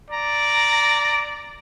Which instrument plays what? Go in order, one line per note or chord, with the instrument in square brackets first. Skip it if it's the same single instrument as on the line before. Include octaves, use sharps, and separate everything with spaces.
[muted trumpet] D5 [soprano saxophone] A#5